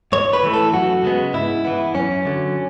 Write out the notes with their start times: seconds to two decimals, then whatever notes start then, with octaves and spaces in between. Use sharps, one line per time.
0.12 G#2 C#5
0.33 B4
0.43 E3 A3
0.53 A4
0.73 F#2 F#4
1.03 C#3 G#3 B3
1.34 G#2 E4
1.65 E3 B3
1.94 F#2 C#4
2.25 D3 F#3